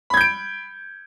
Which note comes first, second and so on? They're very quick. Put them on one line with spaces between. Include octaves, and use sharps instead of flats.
B5 G#6 G6 D7